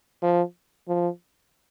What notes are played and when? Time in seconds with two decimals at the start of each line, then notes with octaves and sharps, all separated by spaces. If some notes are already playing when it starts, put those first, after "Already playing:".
0.22 F3
0.88 F3